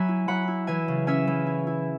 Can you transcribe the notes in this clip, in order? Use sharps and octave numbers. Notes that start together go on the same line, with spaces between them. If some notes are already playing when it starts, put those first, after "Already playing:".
Already playing: F#3 E5 G#5 B5
E4
F#3 F#5 B5
E4
E3 E5 G#5
C#3
C#4 E5 G#5
E3
E4
E4